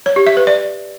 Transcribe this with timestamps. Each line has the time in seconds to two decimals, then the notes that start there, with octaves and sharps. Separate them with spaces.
0.06 C#5
0.16 G4
0.27 E5
0.37 B4
0.47 D5